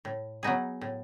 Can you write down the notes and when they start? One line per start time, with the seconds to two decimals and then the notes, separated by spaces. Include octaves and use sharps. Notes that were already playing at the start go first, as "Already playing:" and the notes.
0.05 A2
0.43 F#3 B3 D#4 G#4
0.81 A2